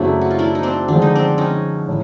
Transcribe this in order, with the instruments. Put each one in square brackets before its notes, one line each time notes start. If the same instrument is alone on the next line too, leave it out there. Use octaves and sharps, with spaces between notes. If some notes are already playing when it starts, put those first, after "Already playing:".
Already playing: [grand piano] F#2 C#3 F#3 A3 C4 [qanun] D4 E4
[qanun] F#4
F4
D4 E4
D#4
C4 D4
[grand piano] D3 F3 G#3 [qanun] D4
[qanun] D#4
C4 D4
C#4 D#4
[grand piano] A2